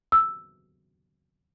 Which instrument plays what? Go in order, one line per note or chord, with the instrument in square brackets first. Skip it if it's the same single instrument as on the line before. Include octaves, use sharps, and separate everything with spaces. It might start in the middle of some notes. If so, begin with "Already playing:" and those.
[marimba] E6